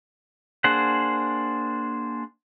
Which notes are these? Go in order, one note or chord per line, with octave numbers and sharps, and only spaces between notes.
A#3 D4 G#4 C5 F#5